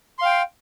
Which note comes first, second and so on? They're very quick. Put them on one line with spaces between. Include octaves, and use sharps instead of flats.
C6 F5 G5